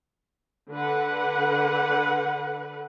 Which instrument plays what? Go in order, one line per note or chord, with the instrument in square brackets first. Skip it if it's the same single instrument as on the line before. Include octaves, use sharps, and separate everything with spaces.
[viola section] D3 B4 F#5